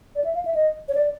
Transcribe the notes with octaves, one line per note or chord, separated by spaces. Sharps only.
D5
E5
F5
E5
D#5
C#5
D5